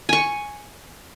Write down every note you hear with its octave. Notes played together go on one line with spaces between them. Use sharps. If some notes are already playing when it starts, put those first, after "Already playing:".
G#5 C#6